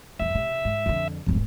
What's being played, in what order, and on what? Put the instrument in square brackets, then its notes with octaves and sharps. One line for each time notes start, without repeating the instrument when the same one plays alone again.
[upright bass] G1 F2 [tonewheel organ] E5
[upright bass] C3
G#2
F2 D3
[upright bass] D1 G#1 [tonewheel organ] F2